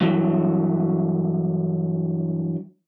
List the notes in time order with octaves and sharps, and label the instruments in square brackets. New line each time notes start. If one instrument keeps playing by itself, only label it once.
[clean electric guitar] G2 E3 F#3